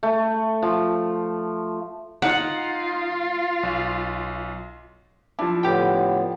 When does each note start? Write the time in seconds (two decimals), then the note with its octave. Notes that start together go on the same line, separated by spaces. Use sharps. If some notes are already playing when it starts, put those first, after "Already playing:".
0.03 A3
0.62 F3
2.22 D#4 F4 F#5
3.63 B1
5.39 F3 D4 E4
5.63 A2 D3 B3 G4 G5